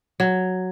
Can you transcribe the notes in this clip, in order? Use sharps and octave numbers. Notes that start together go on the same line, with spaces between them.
F#3